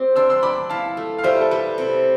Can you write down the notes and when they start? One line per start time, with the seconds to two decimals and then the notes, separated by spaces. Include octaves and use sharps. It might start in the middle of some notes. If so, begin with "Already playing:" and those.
Already playing: C4 G4
0.16 D4 C6 E6
0.30 C6 E6
0.43 D4 B5 D6
0.70 E4 F5 A5
0.97 A3
1.19 F5
1.24 G3 C5 E5
1.41 A4
1.51 G3 B4
1.78 C3